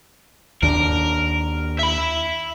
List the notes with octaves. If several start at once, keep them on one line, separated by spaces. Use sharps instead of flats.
D#2 D4 A#4
E5 B5